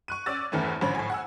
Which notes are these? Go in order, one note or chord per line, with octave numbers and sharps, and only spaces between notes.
C#6 F#6 D#7
C#4 D5 D6 E6 A6
E2 G2 E3 A3 C4 C#4
A1 D3 F3 C#5 B5
A2 F3 G#5
F#5 G#5 E6